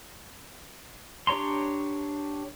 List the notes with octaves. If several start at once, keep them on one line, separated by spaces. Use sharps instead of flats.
D4 G4 C#5 A#5 C6